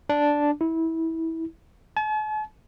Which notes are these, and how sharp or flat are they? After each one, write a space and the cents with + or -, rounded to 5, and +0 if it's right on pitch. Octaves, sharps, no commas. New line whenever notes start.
D4 -5
E4 -20
A5 -45